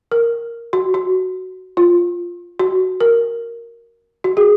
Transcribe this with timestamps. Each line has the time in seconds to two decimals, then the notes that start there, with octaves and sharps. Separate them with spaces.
0.12 A#4
0.73 F#4
0.94 F#4
1.77 F4
2.59 F#4
3.01 A#4
4.24 F#4
4.37 G#4